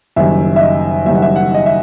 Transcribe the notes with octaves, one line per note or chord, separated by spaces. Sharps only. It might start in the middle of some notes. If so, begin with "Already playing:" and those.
F#1 F#2 D#3 G3 E5
E5
D#5
F#1 F#2 D#3 G3 E5
F#5
E5
F#5
D#5
E5